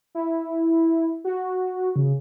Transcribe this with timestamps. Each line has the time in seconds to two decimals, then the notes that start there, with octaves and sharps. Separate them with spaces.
0.15 E4
1.25 F#4
1.96 C#3